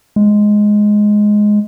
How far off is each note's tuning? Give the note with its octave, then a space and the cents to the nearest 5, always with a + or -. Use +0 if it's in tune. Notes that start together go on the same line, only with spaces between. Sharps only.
G#3 +5